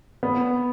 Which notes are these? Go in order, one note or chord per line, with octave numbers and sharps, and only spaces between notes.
B3